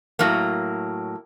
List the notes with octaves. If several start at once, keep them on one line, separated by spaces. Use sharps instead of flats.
A2 F#3 A#3